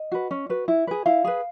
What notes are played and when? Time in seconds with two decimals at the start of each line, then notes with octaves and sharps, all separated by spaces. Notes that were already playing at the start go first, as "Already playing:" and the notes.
Already playing: D#5
0.12 F#4 B4
0.31 C#4
0.49 F#4 B4
0.68 E4
0.87 G#4 B4
1.06 E4 F5
1.24 G#4 B4